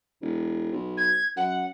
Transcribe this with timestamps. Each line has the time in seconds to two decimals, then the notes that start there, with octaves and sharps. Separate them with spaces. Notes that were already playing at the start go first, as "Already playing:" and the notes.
0.22 E1
0.72 B1
0.97 G#6
1.36 F#2 F#5